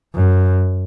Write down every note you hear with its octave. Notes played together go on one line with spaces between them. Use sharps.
F#2